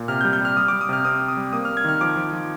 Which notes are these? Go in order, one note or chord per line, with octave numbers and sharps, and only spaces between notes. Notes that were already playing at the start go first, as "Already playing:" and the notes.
Already playing: A#2
C3 F6
G6
G3
G6
G3 F6
G3 D#6
G3 D6
D#6
C3 F6
C4 D#6
C4
D#6
G3
A#3 D#6
A#3 F6
G#6
D#3 F6
F3 D6
F3
F3